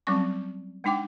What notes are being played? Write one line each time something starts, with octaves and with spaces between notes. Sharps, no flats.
F#3 G3 C4 C#4 C#6
G#3 D4 D#4 G5 D6